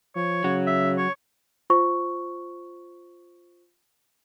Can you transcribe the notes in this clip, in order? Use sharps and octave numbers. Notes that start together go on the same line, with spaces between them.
F3 C#5
C#3 F#3
E5
C#5
F4 C5 C#6